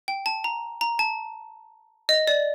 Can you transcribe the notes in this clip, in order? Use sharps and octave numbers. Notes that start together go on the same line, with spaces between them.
G5
A5
A#5
A#5
A5
D#5
D5